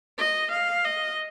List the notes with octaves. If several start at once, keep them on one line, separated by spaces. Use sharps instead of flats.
D#5
F5
D#5